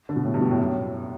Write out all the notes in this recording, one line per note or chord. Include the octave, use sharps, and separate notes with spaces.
D3
B2
A2
G2
B2
A2
F#2